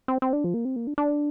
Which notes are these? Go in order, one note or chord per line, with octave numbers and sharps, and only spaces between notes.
C4
C4
D4
F3
A#3
C4
A#3
D4
D4